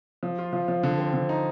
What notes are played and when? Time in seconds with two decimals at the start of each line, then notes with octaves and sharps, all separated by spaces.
0.23 F3
0.38 F4
0.53 F3
0.68 F3
0.83 D3
0.99 C4
1.13 D3
1.29 D#4